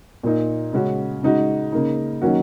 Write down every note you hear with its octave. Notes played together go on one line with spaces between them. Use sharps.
A#2 A#3 D#4
C#3 G#3 C#4 F#4
C#3 G#3 D#4 F#4
C#3 A#3 D#4
D#3 F#3 A#3 C#4 F#4